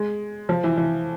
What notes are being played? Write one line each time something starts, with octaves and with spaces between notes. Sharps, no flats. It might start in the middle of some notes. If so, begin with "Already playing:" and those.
Already playing: G#3
F3
E3
E3